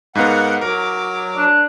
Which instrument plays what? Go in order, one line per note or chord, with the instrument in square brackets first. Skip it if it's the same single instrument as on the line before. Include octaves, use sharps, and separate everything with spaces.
[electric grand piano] G#2 B3 [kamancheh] A#4 F5 [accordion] F#5
[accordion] F#3 [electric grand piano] A#4 [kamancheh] D6
[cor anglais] D4